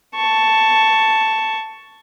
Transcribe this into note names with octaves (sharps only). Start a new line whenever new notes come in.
A5 C#6